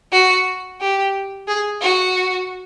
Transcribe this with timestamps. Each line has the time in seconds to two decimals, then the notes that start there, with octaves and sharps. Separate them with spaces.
0.12 F#4
0.81 G4
1.48 G#4
1.81 F#4